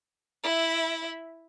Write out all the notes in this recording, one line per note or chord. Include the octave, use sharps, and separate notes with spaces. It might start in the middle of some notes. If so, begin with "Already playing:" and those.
E4 E5